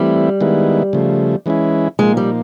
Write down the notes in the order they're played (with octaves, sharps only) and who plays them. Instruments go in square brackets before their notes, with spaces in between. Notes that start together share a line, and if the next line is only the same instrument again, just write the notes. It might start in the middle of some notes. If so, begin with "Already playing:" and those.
Already playing: [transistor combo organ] E3 A3 C4 E4 [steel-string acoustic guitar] G3
[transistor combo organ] D#3 G#3 B3 E4
C#3 F3 A3
E3 G#3 C#4 E4
[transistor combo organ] A#2 F3 A#3 D#4 [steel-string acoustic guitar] G#3
[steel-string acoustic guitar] G3